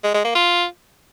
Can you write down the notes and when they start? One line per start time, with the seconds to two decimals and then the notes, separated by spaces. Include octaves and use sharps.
0.04 G#3
0.14 G#3
0.25 A#3
0.35 F4